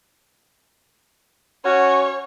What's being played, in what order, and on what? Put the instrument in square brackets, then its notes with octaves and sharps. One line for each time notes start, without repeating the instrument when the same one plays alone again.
[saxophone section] C#4 F#4 [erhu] C#5